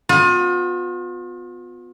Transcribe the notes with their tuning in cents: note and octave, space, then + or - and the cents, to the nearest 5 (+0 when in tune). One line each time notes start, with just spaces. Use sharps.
B3 +25 F4 +40